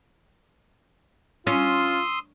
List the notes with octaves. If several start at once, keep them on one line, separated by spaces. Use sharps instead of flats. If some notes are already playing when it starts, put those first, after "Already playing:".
C#4 F4 C6 D#6 E6